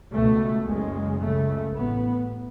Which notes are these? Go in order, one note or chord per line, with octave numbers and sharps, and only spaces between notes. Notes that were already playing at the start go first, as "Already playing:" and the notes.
C#2 B2 A3
F#1 F#2 C#3 G#3
C#2 C#3 A3
A1 A2 B3